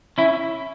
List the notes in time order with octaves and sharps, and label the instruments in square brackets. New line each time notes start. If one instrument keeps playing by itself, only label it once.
[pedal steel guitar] C#4 E4